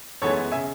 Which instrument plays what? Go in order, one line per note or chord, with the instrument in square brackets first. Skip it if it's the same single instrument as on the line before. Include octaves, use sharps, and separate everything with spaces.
[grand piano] F#2 E3 G#3 B3 E4 A4 C#5
C#3 E5 G#5